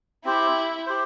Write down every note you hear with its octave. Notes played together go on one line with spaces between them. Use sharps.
C4 E4 G4 C5
G4 C5